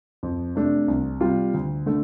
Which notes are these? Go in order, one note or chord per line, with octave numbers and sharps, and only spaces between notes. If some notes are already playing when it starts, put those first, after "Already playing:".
F2
C3 A3 D4
C2
C3 G3 F4
D2
D3 A3